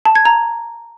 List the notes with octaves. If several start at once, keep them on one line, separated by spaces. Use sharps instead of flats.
A5
G#6
A#5